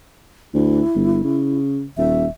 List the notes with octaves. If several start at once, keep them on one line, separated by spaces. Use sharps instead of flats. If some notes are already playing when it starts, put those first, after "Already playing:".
D2 E4
G1
C#3
D#1 E5